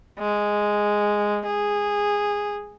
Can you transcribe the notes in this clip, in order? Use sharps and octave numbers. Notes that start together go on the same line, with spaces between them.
G#3
G#4